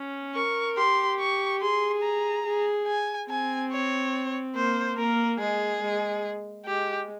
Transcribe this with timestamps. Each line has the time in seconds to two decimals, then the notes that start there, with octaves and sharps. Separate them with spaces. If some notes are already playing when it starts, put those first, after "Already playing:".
Already playing: C#4
0.35 A#4 C#6
0.77 G4 C6
1.20 C#6
1.61 G#4 C6
2.03 A#5
2.45 G#4
2.87 G#5
3.29 C4 G#5
3.72 C#5
4.55 A#3 C5
4.96 A#3 A#4
5.39 G#3 G#4
5.82 G#3
6.66 G#3 G4